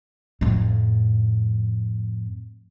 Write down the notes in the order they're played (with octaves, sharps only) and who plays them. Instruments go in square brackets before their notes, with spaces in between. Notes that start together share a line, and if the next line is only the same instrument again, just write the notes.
[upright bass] F2 A2